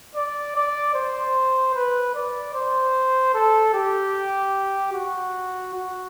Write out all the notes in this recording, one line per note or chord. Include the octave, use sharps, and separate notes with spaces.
D5
D5
C5
B4
D5
C5
A4
G4
F#4
F#4